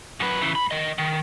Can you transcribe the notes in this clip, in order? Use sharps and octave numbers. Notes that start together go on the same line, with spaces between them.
F#2 B4
C#3 E3
G#2 B5
D#3 D#5
D#3